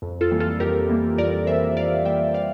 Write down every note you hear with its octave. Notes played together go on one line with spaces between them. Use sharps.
F2
F4 A4
E3 G3 A#3
F4 A4
F2 G4 A#4
E3 G3 A#3
F2 A#4 D5
E3 G3 A#3 C5 E5
F2 D5 F5
E3 G3 A#3 E5 G5
D5 F5